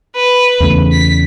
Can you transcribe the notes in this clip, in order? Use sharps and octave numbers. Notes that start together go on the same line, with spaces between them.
B4
E2 C#3 A3
B6